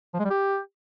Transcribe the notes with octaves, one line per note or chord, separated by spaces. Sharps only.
F3
G#3
G3
G4